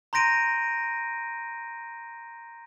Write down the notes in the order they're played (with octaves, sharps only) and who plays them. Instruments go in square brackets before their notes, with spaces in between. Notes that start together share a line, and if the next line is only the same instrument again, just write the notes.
[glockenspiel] A#5 C6 G6 A#6 D7 D#7